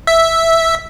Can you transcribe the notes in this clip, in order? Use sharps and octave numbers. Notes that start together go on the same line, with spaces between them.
E5